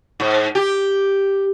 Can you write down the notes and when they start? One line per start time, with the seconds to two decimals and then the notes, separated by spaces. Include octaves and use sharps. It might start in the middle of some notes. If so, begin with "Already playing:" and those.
0.20 G#2
0.55 G4